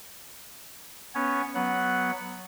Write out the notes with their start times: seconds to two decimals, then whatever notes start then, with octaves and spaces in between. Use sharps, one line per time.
1.15 B3 C#4 C#5
1.55 F#3 B3 F#5